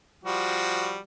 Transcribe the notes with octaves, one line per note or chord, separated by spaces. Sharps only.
F3 G3 F#4